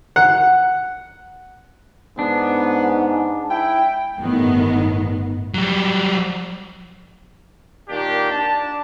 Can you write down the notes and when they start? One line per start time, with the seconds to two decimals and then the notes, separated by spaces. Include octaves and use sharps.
0.16 F#5
2.19 G#2 B3 D4
3.50 E4 G5
4.18 G1 A2 D#3 B3
5.54 F#3 G3
7.89 A#2 D#3 A#3 D4 G4
8.30 D4 A5